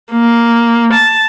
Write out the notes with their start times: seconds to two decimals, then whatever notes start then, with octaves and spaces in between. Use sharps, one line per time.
0.12 A#3
0.93 A5